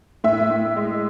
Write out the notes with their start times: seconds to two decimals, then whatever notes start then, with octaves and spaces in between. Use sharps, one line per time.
0.24 A2 E5
0.50 A2
0.76 G#3